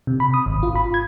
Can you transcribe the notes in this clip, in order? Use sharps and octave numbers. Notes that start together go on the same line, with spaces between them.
C3
B5
D#6
G#1
F4
B5
G#6